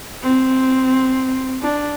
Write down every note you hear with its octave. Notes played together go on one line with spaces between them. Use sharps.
C4
D4